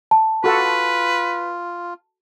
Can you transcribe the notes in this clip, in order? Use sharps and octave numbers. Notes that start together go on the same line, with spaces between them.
A5
F4 F#4 A4 B4 F#5